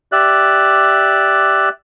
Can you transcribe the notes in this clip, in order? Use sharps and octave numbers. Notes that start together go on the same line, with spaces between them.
G4 D5 E5 F#6